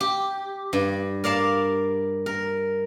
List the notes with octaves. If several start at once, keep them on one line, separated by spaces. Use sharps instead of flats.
G4
G2
A#4 D5 F5 A5
A#4